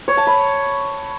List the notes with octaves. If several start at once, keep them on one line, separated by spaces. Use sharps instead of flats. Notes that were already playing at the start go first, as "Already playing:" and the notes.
C#5
A5
B5